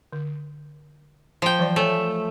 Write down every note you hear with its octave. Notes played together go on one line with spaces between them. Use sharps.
D3
F3 F5 G5
E3 F#3 D5
A3 C#5 E5 G#5